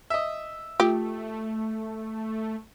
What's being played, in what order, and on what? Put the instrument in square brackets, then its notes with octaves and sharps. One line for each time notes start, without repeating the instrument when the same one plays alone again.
[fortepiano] D#5 E5
[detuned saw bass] A3 [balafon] F4 [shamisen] G4